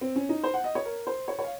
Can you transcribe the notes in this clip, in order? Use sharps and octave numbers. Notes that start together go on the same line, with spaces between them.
C4
C#4
D#4
C5
F#5
D#5
C#5
A#4
C5
C#5
C#5
F5